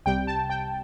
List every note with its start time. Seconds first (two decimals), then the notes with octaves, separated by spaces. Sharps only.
0.06 C2 C3 G3 G5
0.27 A5
0.50 G5